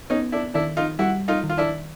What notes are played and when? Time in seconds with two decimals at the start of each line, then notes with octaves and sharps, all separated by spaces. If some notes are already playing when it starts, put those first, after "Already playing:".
0.10 B3 C#4 D#4
0.32 D4 E4
0.54 D#3 D4 E4
0.77 D#4 F4
0.99 G3 E4 F#4
1.28 D#4 F4
1.44 D#3
1.49 F4
1.58 D4 E4